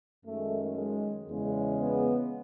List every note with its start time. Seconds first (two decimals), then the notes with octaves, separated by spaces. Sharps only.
0.25 F#2 D#3 G#3 A3
0.76 G#3
1.28 E2 C#3 G#3
1.79 B3